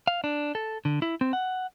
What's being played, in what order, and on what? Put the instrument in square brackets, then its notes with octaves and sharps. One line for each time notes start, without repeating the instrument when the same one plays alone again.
[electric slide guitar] F5
D4
A4
D3
E4
C4
F#5